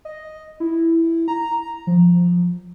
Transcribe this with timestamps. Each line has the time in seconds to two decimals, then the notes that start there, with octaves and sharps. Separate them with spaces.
0.05 D#5
0.60 E4
1.28 A#5
1.87 F3